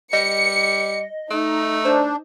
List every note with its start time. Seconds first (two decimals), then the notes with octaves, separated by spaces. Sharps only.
0.13 G3 D#5 C#7
1.31 A3 D#4
1.85 D4 C5